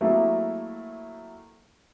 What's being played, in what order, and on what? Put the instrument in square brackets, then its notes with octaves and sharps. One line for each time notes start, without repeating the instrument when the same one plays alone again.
[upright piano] F#3 A3 A#3 C4 E4 G#4